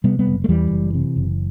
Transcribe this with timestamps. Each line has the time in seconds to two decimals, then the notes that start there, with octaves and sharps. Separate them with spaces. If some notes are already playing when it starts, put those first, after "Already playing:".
0.04 C3 G3 B3
0.19 G3 B3
0.27 F#1
0.44 A3
0.49 E2 E3 G3
0.71 F#1
0.94 C3
1.16 F#1